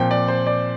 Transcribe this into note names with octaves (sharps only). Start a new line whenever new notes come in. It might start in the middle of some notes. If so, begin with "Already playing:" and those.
Already playing: A#2 F3 C4 G5
D5
C5
D5